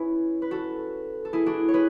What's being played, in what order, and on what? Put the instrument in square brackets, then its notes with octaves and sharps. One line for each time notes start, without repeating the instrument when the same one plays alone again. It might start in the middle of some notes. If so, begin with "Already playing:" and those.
Already playing: [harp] C#4 E4 G#4 B4 C#5
B4
F#4 A4
A4
E4 G#4
D4 F#4
C#5
G#4 B4